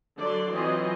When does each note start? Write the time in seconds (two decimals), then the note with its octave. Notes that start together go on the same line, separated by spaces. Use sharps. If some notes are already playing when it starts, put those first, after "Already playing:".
0.19 D3 F#3 D5 C6
0.53 E3 F#3 C4 F4 D#5 G#5